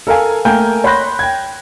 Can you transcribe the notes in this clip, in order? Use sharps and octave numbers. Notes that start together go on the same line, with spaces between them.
A4 A#4 F5 G#5
A3 A#3 A#4 G5 G#5 G6
C#5 B5 C6 F#6 G6 A#6
G5 G#6